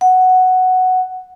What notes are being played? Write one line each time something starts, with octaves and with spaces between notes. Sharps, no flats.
F#5